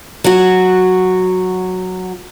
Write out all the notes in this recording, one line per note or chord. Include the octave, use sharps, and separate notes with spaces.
F#3 F#4